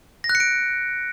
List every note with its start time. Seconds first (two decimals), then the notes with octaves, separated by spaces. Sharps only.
0.24 A#6
0.29 F#6
0.35 C#7
0.40 D7